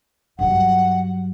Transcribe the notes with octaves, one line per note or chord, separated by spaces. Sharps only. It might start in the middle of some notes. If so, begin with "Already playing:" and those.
G2 F#3 F#5